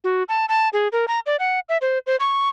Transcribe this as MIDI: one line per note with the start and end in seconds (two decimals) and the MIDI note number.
0.04 0.23 66
0.29 0.46 81
0.49 0.69 81
0.73 0.88 68
0.92 1.06 70
1.08 1.20 82
1.26 1.36 74
1.39 1.60 78
1.69 1.78 76
1.81 1.99 72
2.07 2.16 72
2.20 2.49 85